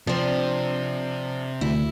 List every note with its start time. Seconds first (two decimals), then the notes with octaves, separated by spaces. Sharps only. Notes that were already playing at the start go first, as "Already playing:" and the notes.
0.07 C3 F3 C4 D4
1.61 D2 E4